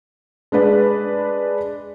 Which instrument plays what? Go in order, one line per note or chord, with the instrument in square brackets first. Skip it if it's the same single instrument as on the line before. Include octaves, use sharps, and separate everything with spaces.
[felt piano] G#3 D4 B4 D5